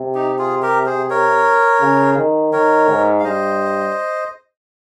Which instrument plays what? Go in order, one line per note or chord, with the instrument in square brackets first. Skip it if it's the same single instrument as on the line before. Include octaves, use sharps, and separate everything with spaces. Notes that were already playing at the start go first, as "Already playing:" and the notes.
Already playing: [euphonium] C3
[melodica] D#4 G4
F4 G#4
G4 A#4
G#4 C5
A#4 C#5
[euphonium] C#3
D#3
[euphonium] D#3 [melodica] A#4 C#5
[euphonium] G#2
[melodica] F5
[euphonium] G2 [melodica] C5 D#5